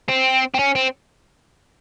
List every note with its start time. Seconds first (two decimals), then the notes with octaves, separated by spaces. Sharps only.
0.09 C4
0.54 C4
0.59 C#4
0.75 C4